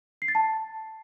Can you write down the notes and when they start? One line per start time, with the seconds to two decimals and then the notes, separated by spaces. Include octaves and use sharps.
0.22 C7
0.28 A6
0.35 A5